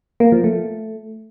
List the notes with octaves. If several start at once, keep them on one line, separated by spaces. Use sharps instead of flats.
A#3
F3
A3